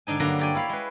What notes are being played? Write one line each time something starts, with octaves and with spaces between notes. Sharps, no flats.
G#2 D3 D4 D#4 G#5
G2 D3 F#3 A#3 A#5
G4 C#5 D5 G5 G#5
E4 F5 B5
G#3 B4